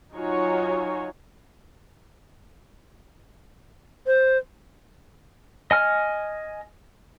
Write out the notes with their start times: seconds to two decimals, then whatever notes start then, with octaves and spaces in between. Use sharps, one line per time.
0.13 F#3 D#4 F4 F#4 C#5 G#5
4.07 C5
5.71 D#5 G#5 F6